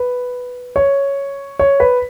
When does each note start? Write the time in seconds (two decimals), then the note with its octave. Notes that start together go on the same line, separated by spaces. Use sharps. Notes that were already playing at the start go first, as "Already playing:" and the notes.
Already playing: B4
0.76 C#5
1.59 C#5
1.80 B4